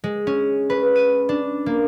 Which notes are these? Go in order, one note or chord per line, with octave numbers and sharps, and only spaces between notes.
G#3
C#4
B4
D#7
D4
A#3